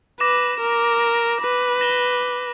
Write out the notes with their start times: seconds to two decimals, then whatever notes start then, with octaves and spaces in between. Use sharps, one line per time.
0.20 B4 D6 A#6 E7
0.60 A#4
1.41 B4
1.81 A#6 E7 G7